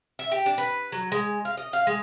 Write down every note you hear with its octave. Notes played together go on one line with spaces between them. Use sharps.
E5
G4
D4
B4
F#3
G#3
F5
D#5
F5
G#3